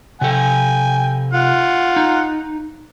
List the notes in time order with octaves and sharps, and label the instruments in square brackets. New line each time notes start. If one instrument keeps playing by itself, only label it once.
[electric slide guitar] C3 A4 [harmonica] G5 G#5
[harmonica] F4 F#5
[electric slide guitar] D#4